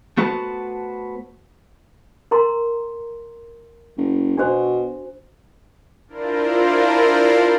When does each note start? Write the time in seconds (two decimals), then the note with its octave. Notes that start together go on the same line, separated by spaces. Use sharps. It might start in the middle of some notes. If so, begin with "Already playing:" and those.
0.17 A3 B3 F#4 B4 C5 A5
2.31 A#4 A#5 C6
3.97 F#1
4.37 B2 D4 F#4 C5
6.08 D4 E4 F4 A#4 C5 D5